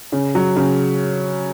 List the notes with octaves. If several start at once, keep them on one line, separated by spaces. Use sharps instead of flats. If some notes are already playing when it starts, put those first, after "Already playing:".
C#3
F#3
C#3